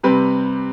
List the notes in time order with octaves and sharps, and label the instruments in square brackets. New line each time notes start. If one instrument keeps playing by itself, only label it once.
[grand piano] C3 G3 C4 B4